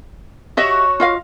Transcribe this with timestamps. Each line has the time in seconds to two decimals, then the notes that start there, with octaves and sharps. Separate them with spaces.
0.57 F#4 G4 C#5 D#5 E5
1.00 F4 D#5 F5